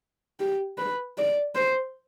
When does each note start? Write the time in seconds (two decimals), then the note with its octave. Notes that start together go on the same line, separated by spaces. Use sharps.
0.40 G4
0.78 B4
1.17 D5
1.55 C5